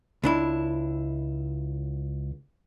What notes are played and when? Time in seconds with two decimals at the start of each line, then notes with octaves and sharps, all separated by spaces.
0.24 C#2 D4 E4